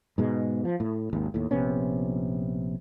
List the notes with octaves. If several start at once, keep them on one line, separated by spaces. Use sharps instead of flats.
G#2 B2 G#3
F3
A2
G#1 D#2
D#2 A2
A#1 C3 B3 C#4